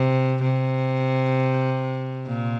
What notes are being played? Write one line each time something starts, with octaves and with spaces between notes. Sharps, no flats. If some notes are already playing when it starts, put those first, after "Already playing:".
Already playing: C3
C3
A#2